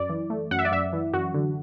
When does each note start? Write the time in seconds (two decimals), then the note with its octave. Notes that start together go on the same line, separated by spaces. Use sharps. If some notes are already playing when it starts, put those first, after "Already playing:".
Already playing: F#2 D5
0.09 E3
0.30 A3
0.51 F#2 F#5
0.59 E5
0.65 D5
0.72 F#2 E5
0.93 E3
1.13 F#2 F#4
1.34 D3